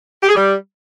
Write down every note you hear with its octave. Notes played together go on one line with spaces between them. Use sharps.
G4
G#4
G3